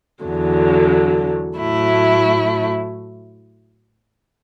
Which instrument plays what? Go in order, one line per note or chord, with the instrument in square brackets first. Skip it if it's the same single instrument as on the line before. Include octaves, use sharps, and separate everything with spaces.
[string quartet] E2 D3 F#3
A2 F#3 A3 E4